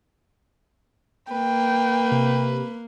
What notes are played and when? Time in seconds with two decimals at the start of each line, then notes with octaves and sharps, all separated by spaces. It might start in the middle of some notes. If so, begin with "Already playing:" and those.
1.31 A#3 B4 G5
2.12 C3